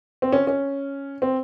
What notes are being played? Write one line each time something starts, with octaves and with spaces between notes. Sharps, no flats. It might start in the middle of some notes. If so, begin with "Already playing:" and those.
C4
C#4
C#4
C4